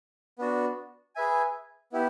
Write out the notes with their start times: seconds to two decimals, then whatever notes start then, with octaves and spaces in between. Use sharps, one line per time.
0.39 B3 D4 F#4
1.15 G#4 B4 E5 G#5
1.92 B3 E4 G4